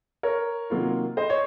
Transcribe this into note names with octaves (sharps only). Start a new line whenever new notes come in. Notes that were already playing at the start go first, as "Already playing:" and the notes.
A#4 C#5
C3 D#3 F#3 A#3 F4
C5 D#5
C#5